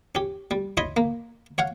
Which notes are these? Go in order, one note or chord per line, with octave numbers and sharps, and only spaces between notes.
C#4 G4
G3
E4 C#5 D#5 B5 C6
A#3
C#5 F5 F#5